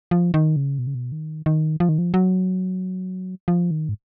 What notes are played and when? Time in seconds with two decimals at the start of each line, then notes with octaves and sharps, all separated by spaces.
0.11 F3
0.34 D#3
0.56 C#3
0.79 B2
0.87 C#3
0.95 B2
1.12 D#3
1.46 D#3
1.80 F3
1.89 D#3
1.98 F3
2.14 F#3
3.48 F3
3.71 D#3
3.89 G#2